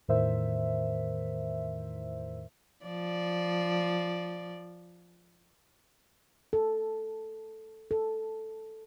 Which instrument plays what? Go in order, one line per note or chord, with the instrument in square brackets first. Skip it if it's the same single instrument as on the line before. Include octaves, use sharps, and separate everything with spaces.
[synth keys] E2 A2 D#3 A#4 C5 E5
[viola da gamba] F3 D5
[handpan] A4
A4